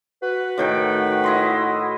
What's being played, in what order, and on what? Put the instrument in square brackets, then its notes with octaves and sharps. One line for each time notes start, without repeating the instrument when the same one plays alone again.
[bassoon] F#4 [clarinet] B4
[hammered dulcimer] A2 D#3 G5
E4 D#5 C6